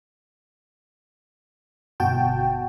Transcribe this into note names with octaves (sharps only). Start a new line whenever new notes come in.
G1 B2 F#4 G5 A5